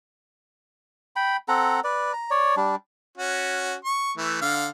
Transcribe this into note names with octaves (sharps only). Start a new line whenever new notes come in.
G5 B5
C4 A4 F#5 A#5
B4 D5
A#5
C#5 D5
G3 D4
C#4 F#4
C#6
E3 A3
D3 F5